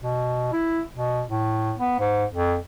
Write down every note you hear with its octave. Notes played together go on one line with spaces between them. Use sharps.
B2
E4
B2
A2
B3
G#2
F2